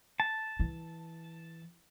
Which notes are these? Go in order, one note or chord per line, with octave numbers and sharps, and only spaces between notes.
A5
E3